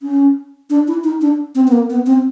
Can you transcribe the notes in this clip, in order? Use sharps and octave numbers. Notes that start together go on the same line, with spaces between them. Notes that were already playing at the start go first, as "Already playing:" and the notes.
C#4
D4
E4
D#4
D4
C4
B3
A#3
B3
C4